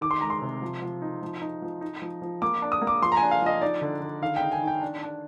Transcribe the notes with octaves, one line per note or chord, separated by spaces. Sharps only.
D#3 D6
C6
G#3 A#5
C6
C3
F3
F3
D#4
F3
D#4
F3
D#4
F3
F3
A#3 D6
D4
D#6
A#3
D6
F3 C6
A#5
G#5
D4
F5
F3 D#5
D#4 D5
D3
D3
D#3 F5
G5
D#4
G#5
D#3
G5
D4
D4